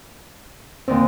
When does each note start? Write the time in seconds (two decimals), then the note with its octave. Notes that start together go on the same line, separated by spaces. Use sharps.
0.88 E2 A#2 D3 D#3 C4 C5